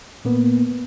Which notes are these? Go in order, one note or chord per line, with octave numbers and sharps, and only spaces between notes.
A#2 A#3 B3